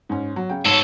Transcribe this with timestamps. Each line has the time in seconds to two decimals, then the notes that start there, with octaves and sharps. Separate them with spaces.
0.09 G#2 C#4
0.36 F#3
0.49 C#3 G5
0.65 G#2 B2 A4 C#5 A5